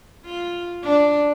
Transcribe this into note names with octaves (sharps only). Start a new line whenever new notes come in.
F4
D4